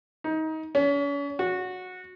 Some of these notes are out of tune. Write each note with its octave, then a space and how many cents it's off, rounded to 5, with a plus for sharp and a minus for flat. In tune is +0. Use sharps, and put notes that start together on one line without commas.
D#4 +25
C#4 +40
F#4 -15